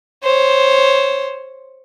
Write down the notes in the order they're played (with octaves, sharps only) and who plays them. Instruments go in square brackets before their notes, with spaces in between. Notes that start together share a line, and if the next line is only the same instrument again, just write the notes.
[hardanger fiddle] C5 C#5